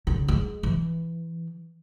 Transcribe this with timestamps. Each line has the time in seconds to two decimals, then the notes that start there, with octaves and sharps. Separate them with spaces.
0.07 C#3
0.28 G#3
0.63 E3